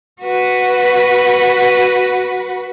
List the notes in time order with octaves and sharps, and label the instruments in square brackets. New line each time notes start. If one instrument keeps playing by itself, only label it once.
[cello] F#4 B4